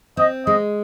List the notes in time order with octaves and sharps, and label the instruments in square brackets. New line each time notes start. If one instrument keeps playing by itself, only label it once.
[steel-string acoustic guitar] C4 [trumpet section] D#5
[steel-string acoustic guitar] G#3 [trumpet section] D#5